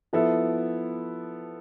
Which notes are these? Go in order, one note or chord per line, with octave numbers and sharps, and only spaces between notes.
F3 B3 E4 A4